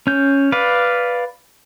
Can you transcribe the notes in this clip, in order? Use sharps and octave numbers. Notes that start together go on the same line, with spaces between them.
C#4 G6
B4 D5 F5